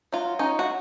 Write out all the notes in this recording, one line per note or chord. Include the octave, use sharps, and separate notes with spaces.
F#3 F4
C#4 D#4
F#4